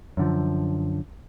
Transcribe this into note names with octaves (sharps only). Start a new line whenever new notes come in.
F#2 D3 F3